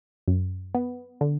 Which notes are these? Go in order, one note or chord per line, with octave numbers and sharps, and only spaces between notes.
F#2
B3
D3